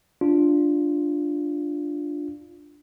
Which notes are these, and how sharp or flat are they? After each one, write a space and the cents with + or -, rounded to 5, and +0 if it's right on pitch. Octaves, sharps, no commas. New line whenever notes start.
D4 +0 F4 +0